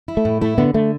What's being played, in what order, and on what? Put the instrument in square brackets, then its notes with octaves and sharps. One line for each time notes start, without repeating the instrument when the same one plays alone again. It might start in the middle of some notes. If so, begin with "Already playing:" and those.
[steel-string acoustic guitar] E4
[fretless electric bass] A3
[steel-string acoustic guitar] A2
[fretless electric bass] A3 [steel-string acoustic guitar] E4
[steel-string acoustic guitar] D3 [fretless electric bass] B3
[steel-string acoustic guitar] D3 [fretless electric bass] A3